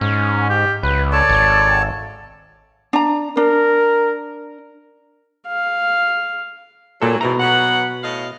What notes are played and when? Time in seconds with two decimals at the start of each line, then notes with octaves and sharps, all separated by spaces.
0.01 G#2 C#4
0.50 G4
0.83 C#2 B4
1.12 A4 C#5 D5 A5
1.29 G#1
2.93 D4 A#5
3.37 D4 A#4
5.47 F5
7.02 A#2 F#3 A4
7.21 G#2 B2 E3 A#5
7.40 F#3 B3 F#5
8.02 A2 D#5 F5